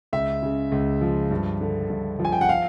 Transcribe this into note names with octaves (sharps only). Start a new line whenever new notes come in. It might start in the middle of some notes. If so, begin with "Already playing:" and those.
C#2 E5
C#3
C#2
F3
G2
D3
G2
F3
G#5
G5
F#5
F5